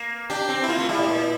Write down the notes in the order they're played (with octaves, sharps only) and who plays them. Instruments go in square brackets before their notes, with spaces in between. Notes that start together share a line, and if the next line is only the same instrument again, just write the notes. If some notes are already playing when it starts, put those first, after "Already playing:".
Already playing: [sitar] A#3
[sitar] D4 [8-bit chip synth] G4
[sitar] C4
[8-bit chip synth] E4
[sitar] A#3 [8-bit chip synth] F4
[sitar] A3
[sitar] G3 [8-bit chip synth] E4
[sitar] A2
A#2